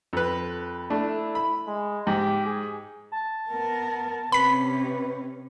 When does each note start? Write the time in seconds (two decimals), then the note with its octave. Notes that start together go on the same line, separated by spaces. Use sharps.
0.13 F2 B4
0.90 A3 D4 E4
1.35 B5
1.67 G#3
2.07 G#2 G4
2.46 G#4
3.12 A5
3.50 B3 A#4
4.32 C3 C#4 B4 B5 B6